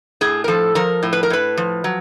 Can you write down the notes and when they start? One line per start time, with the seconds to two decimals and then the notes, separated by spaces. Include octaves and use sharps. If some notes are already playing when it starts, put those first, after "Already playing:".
0.21 A2 G#4
0.44 A#4
0.48 F3 A4
0.75 F3 A#4
1.03 A2
1.13 B4
1.23 A#4
1.30 A2 B4
1.57 F3
1.84 F#3